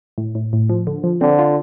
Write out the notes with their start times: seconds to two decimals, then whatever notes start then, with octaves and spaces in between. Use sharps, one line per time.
0.18 A2
0.35 A2
0.53 A2
0.70 F3
0.87 D3
1.04 F3
1.21 D3 C4
1.39 F4